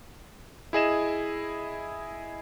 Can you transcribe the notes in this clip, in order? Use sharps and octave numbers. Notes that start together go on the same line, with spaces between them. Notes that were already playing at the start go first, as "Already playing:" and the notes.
E4 G#4 D#5 E7